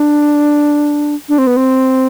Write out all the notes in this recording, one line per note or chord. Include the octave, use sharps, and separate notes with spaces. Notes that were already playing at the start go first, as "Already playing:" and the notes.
Already playing: D4
D4
C4
B3
C4